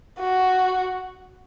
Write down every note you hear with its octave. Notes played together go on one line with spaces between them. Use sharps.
F#4